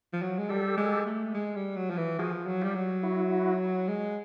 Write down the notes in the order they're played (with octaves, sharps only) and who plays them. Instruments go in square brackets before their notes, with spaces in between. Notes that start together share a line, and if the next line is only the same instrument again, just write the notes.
[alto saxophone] F3
F#3
G#3
[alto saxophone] G3 [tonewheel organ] G4 A4
[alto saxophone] G#3
A3
G#3
G3
F#3
F3
E3
[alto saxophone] F3 [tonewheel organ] F#4 G#4
[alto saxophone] F#3
[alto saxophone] G3 [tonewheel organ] F4 G4
[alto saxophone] F#3
[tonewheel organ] E4 F#4
[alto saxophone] G#3